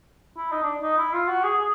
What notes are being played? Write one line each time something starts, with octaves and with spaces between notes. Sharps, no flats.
E4
D#4
D4
D#4
E4
F4
F#4
G#4
G#4